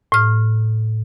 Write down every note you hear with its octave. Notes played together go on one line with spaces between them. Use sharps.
A2 F6